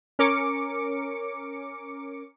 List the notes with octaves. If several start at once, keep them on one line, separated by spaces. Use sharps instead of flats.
C#4 A#4 D6 C#7